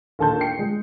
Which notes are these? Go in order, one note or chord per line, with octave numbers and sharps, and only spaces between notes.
A#1 D#2 A4 A5 C6 G6
G5 C7 C#7
G#3